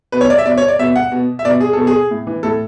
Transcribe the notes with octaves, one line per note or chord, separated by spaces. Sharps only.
B2 B4
C#5
D5
E5
B2 D5
C#5
D5
B2 E5
F#5
B2
E5
B2 D5
G#4
B2 A4
G#4
A2
E3
A2 A4